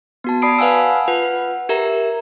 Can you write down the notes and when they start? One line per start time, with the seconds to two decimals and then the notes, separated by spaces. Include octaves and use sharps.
0.24 B3 F#4 A5
0.42 D5 A5 B5 D#6 C7 D7
0.59 B4 F5 F#5 G#5 E6
1.08 F4 B4 F#5
1.69 G4 A#4 E5 A#5